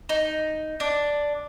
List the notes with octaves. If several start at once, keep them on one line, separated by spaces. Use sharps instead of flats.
D#4
D4